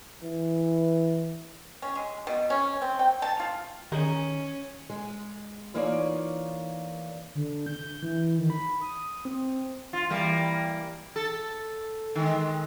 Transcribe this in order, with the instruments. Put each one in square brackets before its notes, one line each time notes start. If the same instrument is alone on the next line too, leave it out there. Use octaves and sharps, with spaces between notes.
[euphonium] E3
[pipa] C#4
G#3
B2
C#4
C4
G5
A5
F4
[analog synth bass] D#3 [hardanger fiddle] C#4 [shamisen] D#4 G#4 A#4
[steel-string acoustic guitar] G#3
E3 A#3 D#4 F4 C#5 D5
[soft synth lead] D3
G6
E3
D#3
B5
D#6
C4
[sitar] F4
E3 G3 A#3
A4
D#3 G#3